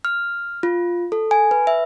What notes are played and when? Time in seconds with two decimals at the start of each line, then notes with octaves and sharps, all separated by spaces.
0.05 F6
0.63 F4
1.12 A4
1.31 G#5
1.51 B4
1.67 E5